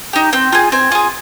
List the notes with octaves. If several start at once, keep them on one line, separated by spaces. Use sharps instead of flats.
D#4 G4
C4 G5
F4 G#4
C4 G#5
F4 G#4